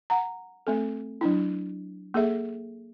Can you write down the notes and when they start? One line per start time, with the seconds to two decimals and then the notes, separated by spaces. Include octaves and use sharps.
0.10 F#5 A#5
0.67 A3 C4 A4
1.21 F#3 D4 E4
2.14 A#3 G#4 A4 E5